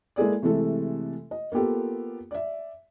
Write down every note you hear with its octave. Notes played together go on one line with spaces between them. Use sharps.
G#3 A#3 E4 G#4 A4 D5
C3 E3 G#3 A3 A4
D#5
A#3 B3 F4 G4 A4
D5 E5